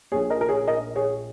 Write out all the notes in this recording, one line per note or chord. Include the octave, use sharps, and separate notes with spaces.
A#1 A#2 G#4 C#5
A#4 D#5
A#4
G#4 C#5
A#4 D#5
G#4 C#5